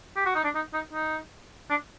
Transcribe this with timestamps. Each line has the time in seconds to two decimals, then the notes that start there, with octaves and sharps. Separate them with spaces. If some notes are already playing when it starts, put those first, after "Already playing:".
0.16 G4
0.26 F#4
0.35 D#4
0.44 D4
0.55 D#4
0.73 D#4
0.93 D#4
1.70 D4